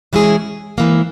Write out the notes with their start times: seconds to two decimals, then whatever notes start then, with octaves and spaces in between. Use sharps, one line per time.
0.13 E3 G#3 C#4 E4 G#4
0.78 G#2 E3 A#3